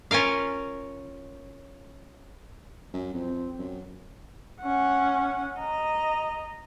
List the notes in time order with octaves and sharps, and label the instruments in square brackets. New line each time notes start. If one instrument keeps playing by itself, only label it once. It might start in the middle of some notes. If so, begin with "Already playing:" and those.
[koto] C#4 F4 A#4 F5
[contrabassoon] F#2
[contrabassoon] F2 [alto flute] C4
[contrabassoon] F#2
[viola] C#4 F#5
D#5 A#5